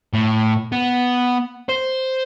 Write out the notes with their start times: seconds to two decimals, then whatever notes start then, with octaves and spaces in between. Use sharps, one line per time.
0.13 A2
0.72 B3
1.69 C5